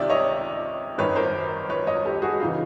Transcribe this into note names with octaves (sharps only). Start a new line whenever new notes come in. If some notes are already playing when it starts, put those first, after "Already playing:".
Already playing: C#2 C3 D#3 D5 E5
C#5 D#5
G#1 F#2 D#3 B4 C#5
A#4 C5
B4 C#5
C#5 D#5
G4 A4
F#4 G#4
C#3 E3 D#4 F4